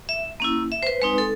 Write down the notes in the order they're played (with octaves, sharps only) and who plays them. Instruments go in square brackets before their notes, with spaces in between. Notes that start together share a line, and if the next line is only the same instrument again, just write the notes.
[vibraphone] E5
A#3 C#4 E4
E5
C5
B4
G#3 C4 D#4 B4
A4